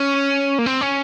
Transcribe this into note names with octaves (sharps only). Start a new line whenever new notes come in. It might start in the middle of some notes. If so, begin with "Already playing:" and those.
Already playing: C#4
A#3
C4
C#4